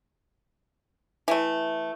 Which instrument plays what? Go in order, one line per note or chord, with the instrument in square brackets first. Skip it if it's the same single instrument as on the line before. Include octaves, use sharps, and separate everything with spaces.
[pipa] E3 A3